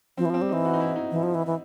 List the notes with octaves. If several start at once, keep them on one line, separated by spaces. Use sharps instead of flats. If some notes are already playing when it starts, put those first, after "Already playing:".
F3 C4
E3
F3
C4
G3
E3 D#4
F#4
D#4
E4
D#4
E3
F3
E3
E3